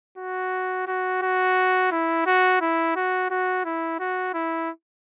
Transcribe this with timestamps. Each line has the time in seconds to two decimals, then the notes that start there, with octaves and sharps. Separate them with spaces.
0.18 F#4
0.87 F#4
1.22 F#4
1.92 E4
2.26 F#4
2.61 E4
2.96 F#4
3.31 F#4
3.65 E4
4.00 F#4
4.34 E4